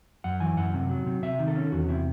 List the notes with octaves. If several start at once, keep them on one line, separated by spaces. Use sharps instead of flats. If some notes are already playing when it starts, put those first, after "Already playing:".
F#2 F#5
E3 G#5
F#2 F#5
C3
F#3
C3
C3 E5
D#3
A4
C#4
E2 F#4
C3 E4